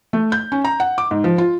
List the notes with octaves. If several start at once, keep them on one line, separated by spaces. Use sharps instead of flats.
A3
G6
C#4
A#5
F#5
D6
G#2
F3
F4